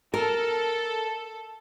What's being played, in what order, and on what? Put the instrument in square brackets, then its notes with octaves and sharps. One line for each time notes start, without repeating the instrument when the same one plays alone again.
[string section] A4 [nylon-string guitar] A#4